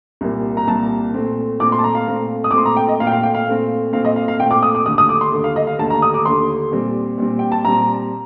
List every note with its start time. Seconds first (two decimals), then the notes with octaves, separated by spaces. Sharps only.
0.21 C2 A#2 G3 A#3
0.57 A#5
0.67 C2 A#2 G3 A#3 A5
1.14 A#2 A3 C4
1.60 A#2 A3 C4 D6
1.72 C6
1.79 A5
1.84 A#5
1.95 F5
2.06 A#2 A3 C4
2.44 D#6
2.51 D6
2.54 A#2 A3 C4 C6
2.65 A#5
2.77 G5
2.88 D#5
3.00 A#2 A3 C4 F5
3.07 G5
3.12 F5
3.23 G5
3.34 F5
3.46 A#2 A3 C4
3.93 A#2 A3 C4 F5
4.05 D#5
4.16 F5
4.28 F5
4.39 A#2 A3 C4 G5
4.51 D6
4.63 D#6
4.75 D6
4.85 D#2 D3 A3 D#6
4.98 D#6
5.09 D6
5.21 C6
5.32 D#2 D3 A3
5.44 F5
5.56 D#5
5.67 F5
5.79 D#2 D3 A3 A5
5.90 A#5
6.02 D#6
6.14 D6
6.25 D#2 D3 A3 C6
6.72 A#2 G3 C4
7.18 A#2 G3 C4
7.39 G5
7.52 A5
7.65 A#2 G3 C4 A#5